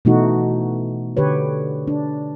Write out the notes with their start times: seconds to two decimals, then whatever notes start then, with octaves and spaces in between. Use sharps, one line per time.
0.05 B2 E3 A3 D#4 F#4
1.17 D3 G4 B4 C#5
1.88 D4